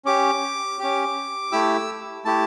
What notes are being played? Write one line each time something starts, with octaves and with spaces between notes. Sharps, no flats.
C#4 G4 D6
C#4 G4
A3 E4 G4 E6
A3 E4 G4 A5